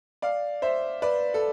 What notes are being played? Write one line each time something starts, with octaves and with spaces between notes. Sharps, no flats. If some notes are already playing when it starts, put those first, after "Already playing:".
D5 F5
C5 E5
B4 D5
A4